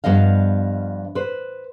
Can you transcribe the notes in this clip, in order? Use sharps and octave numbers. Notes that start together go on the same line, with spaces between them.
G2 F3 B3 D#5 F5
B4 C5